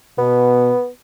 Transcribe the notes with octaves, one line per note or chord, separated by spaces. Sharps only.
B2 B3